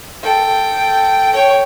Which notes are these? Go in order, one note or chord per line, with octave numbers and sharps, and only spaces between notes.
A4 G5
C#5 G5